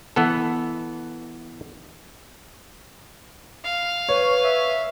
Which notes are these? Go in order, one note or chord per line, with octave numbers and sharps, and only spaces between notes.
E3 B3 A4
F5
B4 C#5
E5